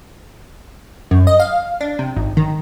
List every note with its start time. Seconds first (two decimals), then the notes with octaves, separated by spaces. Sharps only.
1.11 F#2
1.27 D#5
1.40 F5
1.81 D4
1.99 C3
2.17 G#1
2.37 D#3